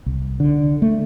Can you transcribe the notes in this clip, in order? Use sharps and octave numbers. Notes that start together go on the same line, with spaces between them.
C2
D3
A3